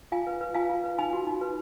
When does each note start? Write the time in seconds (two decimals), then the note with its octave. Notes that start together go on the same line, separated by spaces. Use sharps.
0.12 F4 F5 G#5
0.27 B4
0.41 B4
0.55 F4 F5 G#5
0.69 F4
0.84 B4
0.98 D#4 G#5 B5
1.13 F#4
1.27 D#4
1.41 B4